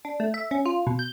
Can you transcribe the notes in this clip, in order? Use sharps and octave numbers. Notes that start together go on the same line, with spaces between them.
D4
A3
E5
C#4
F4
B2
G6